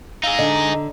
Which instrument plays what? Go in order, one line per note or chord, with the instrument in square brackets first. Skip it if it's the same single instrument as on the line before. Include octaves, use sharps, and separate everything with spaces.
[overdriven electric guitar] D#4 G#4 [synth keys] F5 E6 A#6
[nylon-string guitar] D3 [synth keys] D#5 A#5